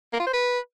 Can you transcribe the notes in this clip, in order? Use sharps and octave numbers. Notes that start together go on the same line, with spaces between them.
A#3
F4
C5
B4